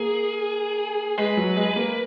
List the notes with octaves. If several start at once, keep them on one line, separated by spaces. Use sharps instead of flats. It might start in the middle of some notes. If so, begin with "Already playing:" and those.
Already playing: A#3 G#4
G#3 B4
F#3
G#3
G#3
A#3